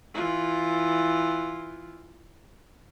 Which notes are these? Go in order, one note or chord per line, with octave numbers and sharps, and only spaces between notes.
E3 F4